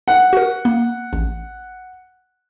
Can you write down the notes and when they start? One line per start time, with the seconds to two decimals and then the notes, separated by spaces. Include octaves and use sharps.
0.08 F#5
0.33 F#4 A#4
0.65 A#3
1.13 A1